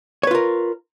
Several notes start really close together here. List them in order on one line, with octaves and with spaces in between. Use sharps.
C#5 B4 F4 A#4